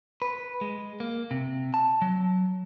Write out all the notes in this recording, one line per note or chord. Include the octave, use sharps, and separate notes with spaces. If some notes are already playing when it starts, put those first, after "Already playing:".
B4
G#3
A#3
C3
A5
F#3